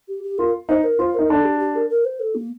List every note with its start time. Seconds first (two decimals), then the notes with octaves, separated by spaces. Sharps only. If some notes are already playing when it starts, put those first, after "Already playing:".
0.08 G4
0.24 G4
0.38 F4 A#4
0.69 D#4 C5
0.84 A#4
0.99 F4 C5
1.14 D#4 A#4
1.29 D4 A4
1.44 G4
1.60 G4
1.75 A#4
1.90 A#4
2.05 C5
2.20 A4
2.35 A#3